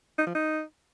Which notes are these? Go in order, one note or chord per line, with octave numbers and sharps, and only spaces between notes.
D#4
F3
D#4